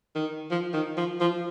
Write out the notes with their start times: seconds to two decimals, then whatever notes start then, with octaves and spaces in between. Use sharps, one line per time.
0.15 D#3
0.51 F3
0.73 D#3
0.97 F3
1.20 F3